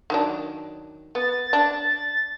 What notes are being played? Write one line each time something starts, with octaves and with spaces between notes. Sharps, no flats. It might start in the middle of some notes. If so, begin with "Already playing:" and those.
D#3 F#3 D4
B3 A6
D4